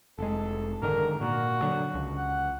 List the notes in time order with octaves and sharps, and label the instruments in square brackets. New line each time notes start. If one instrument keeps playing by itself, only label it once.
[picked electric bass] F1 G#3 [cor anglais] A4
[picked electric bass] G#2 D3 D#3 [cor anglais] A#4
[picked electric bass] A#2 [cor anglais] F#4
[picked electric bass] D3 F#3
C#2
[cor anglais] F#5